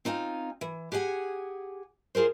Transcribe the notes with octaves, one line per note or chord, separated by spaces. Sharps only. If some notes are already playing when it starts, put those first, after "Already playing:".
C4 D#4 F4 G#5
E3
G4 G#4 F#5 G#5
F4 G#4 A#4 C5